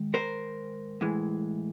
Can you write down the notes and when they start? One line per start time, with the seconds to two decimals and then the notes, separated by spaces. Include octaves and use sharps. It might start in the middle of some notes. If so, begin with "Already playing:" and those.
Already playing: G#2 D#3 G#3
0.14 A#4 C5
1.01 A2 E3 G#3